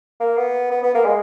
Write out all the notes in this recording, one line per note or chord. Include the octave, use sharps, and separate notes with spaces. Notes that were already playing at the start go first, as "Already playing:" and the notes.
A#3
B3
B3
B3
A#3
G#3